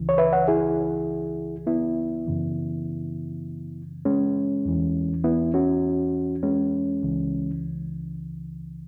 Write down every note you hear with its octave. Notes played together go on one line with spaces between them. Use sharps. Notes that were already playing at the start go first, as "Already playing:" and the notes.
Already playing: C#2 C#3 E3
C#5
B4 E5
C#5 F#5
E4 G#4
B3 E4
F#2 C#3 E3
G#3 C#4
E2 E3
B3 E4
C#4 F#4
G#3 C#4
C#2 C#3 E3